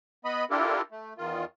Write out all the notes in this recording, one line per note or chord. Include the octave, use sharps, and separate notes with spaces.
B3 D#5 B5
D4 E4 F4 G4 A4 A#4
A3
E2 D#3 F4